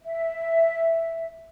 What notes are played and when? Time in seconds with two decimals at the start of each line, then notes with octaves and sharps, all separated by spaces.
0.03 E5